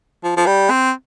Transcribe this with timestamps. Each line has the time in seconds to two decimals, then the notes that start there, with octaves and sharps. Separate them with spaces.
0.24 F3
0.37 F3
0.47 G3
0.70 C4